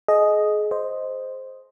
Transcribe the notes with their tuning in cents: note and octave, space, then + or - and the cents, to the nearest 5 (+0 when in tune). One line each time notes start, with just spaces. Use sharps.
G#4 +30 D#5 +0
C5 +0 D#5 +0